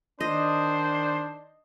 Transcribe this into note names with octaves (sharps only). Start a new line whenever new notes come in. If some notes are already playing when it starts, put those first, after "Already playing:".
D#3 D4 C5 D#5